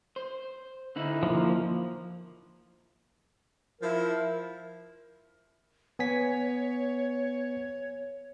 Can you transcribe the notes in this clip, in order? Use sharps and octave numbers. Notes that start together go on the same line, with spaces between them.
C5
D3 D#4 E4
F3 A#3
F3 E4 A#4
B3 C#5 G#5 B6